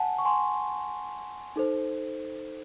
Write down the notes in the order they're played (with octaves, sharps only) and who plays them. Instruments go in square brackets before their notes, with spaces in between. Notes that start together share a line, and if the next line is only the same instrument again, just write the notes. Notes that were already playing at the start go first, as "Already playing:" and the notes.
Already playing: [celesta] F#5 G#5 A5
C#6
G#5 C6
D#4 A4 C5